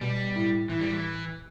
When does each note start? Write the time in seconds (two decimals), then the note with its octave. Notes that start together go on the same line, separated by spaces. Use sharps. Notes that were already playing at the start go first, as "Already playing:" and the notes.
0.01 B2 G3
0.35 A2
0.69 A2 E3
0.81 G3
0.91 E3